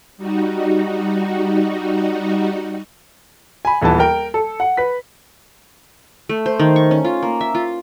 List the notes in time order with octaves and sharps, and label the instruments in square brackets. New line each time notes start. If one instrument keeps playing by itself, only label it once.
[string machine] G3 D#4 F#4
[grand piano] G#5 B5
D#1 E3 B3 E4 A5
A#4 G5
A4
F#5
B4 B6
[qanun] A3
C5
D#3
C#6
C#4
F4
A#3
E5
F4